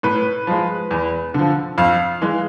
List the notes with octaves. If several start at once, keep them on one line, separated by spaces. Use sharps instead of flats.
A2 B4
F3 G#3
E2
D3 F3
F2 F5
E3 G#3